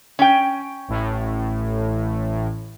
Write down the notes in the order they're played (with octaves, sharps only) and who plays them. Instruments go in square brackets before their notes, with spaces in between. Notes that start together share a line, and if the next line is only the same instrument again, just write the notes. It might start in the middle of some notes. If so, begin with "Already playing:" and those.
[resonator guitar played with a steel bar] C#4 G5
[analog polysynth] A1 A2